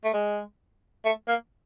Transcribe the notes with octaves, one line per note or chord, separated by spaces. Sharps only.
A3
G#3
A3
A#3